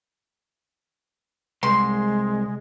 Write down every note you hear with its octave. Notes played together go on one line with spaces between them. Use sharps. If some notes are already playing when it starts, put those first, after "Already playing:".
C2 G#3 C6